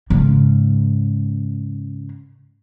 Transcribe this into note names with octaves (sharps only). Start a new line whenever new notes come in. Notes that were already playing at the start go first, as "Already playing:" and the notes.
G#2 C#3